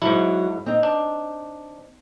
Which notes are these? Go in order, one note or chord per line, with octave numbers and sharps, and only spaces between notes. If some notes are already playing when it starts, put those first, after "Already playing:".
G#2 F#3 E4
C4 D#4
D4